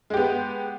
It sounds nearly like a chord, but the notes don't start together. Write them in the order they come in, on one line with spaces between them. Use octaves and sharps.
G#3 G4 B3